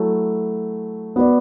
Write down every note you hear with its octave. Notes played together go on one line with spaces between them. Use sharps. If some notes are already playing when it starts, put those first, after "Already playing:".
Already playing: F#3 A3 E4
B3 F#4 B4 D5